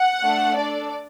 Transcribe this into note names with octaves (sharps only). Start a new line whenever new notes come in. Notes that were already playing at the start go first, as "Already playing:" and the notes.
Already playing: F#5
A3 D4 A4
D4 A4 D5